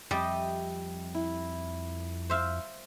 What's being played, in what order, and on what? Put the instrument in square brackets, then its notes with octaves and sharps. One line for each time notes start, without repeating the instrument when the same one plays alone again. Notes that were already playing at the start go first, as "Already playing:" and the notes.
[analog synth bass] F2 [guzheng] G3 [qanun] G4 D#5 E5
[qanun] E4
[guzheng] C5 E5 F5